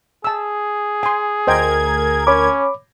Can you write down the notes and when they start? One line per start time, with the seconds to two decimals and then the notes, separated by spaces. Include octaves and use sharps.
0.24 G#4 A5 E6
1.03 G#5 C6
1.47 D2 A#4 C5 D#5 G5 G#6
2.27 C#4 C#5 B5 D6